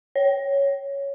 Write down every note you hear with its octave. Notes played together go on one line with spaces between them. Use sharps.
C#5